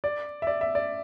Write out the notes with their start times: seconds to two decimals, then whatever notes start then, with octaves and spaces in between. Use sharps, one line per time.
0.04 D5
0.42 E5
0.47 D5
0.61 E5
0.75 D5